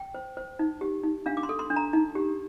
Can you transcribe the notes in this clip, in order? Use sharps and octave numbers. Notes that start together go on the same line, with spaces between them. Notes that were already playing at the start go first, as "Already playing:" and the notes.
Already playing: G5
C5
C5
D#4
G4
D#4
D4 F5
D6
C6
A4
C6
D4
A#5
D#4
G4